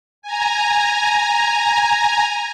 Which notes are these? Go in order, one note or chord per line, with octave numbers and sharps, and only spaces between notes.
G#5 A#5